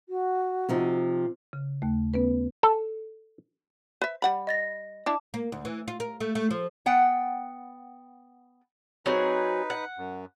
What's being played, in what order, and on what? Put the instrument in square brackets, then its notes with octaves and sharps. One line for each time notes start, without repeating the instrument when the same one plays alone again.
[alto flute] F#4
[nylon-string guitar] C3 F3 D#4
[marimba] C#3
D#2 A3
B3 C#4 B4
[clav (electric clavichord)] A4
[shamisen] B4 E5
G3 F#5 B5
[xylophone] D#5 A6 A#6
[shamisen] D4 E4 [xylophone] A5 D6
[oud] A#3
D2
E3
F4
A#4
A3
A3
F3
[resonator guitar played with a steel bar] B3 F#5 G5
[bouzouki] F#3 C4 G#4 [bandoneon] D#4 B4
[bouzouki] F#5
[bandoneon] F#2